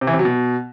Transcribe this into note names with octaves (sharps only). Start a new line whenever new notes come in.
C3
E3
C3
F#3
B2